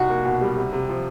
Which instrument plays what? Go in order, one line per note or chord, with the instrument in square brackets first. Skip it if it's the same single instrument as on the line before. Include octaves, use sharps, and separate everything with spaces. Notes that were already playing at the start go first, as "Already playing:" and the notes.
Already playing: [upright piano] C2 [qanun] D#4 F#4
[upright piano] A#3
B2
G3
C3
C3
F3